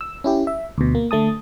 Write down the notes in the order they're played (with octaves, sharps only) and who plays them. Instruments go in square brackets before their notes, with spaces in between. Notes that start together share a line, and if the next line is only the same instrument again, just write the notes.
[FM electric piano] E6
C#4 E4 G4
E5
D2 B2
A#3
D3 A3 A5 D#6